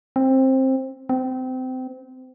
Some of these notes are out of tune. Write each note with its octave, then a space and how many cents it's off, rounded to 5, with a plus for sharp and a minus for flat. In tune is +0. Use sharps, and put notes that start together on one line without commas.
C4 +15
C4 -25